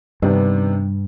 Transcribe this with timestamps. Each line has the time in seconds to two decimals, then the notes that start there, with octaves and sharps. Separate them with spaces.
0.22 G2 C3 D#3 B3 D4